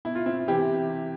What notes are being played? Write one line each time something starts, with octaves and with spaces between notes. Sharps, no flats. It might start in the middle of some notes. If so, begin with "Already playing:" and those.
B2 E4
F4
C4 E4
C3 E3 E4 G4